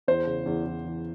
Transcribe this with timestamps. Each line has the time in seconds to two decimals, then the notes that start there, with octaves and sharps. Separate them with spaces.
0.08 E2 C5
0.26 C#3
0.46 E2
0.66 E2
0.85 E3